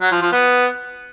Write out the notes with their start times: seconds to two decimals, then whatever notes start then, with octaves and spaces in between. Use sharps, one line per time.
0.01 F#3
0.12 F3
0.22 F3
0.32 B3